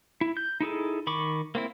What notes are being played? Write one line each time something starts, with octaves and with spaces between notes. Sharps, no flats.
E4
G6
D#4 E4 G#4 A4
D#3 B5 C#6 D6
A#3 C4 E4